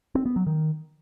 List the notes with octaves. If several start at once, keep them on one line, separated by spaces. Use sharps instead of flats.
C4
B3
F#3
D#3